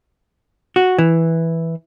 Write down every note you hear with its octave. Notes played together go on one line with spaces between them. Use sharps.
F#4
E3